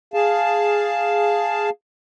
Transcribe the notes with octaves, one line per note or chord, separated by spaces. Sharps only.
G#4 F5 A5